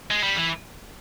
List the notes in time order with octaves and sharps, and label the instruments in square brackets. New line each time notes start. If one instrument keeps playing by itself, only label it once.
[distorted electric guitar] G#3
G3
E3